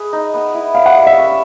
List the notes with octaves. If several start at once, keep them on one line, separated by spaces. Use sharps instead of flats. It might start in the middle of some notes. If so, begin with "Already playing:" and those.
Already playing: G#4 B4
D#4
B3
E4
B3 F5
F#5
G3
E5
C#4